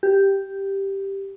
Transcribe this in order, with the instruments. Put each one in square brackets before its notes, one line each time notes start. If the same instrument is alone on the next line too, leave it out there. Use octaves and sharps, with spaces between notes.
[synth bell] G4